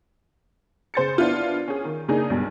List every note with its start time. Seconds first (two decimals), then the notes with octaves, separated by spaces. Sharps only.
0.94 C#3 C5 A6 C#7
1.18 B3 D4 E4 F4
1.68 C#4 G#4
1.85 D#3
2.08 C#3 A#3 D4 D#4 G#4
2.30 B1 G2